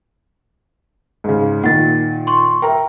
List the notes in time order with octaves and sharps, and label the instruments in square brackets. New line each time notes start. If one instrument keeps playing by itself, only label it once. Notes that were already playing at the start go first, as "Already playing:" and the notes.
[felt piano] G#2 C#3
[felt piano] A#2 D#3 [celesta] F#5 A6
[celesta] C6 C#6
[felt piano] A#4 E5 A#5 [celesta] G5